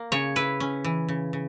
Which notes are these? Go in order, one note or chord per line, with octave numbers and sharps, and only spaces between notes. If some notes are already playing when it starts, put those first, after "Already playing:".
Already playing: A#3
C#3 C#5
E4 B4
C#4
E3
C#3
C#3